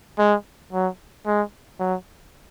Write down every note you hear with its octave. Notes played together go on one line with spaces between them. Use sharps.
G#3
F#3
G#3
F#3